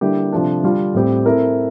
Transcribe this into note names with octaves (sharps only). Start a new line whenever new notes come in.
D3 G3 A#3 E4 G4
C3 F3 A3 D4
D3 G3 D4 F4
A2 G3 C4 G4
A3 C4 E4 A#4